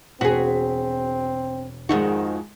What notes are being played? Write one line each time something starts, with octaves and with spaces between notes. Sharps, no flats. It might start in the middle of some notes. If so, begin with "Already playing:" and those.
E1 C4 F#4 G#4 B6
F2 G#2 D#3 G#3 D#4 F#4